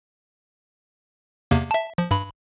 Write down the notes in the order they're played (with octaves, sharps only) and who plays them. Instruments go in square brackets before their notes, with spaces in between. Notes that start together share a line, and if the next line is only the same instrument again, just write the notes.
[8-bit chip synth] E2 C3 A#3
E5 A5
F3
G2 B5